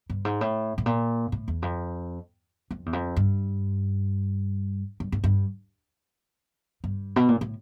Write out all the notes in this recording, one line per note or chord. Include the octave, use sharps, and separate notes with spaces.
G2
G#2
A2
A2
A#2
A2
E2
F2
F2
E2
F2
G2
G2
G#2
G2
G2
B2
A#2
A2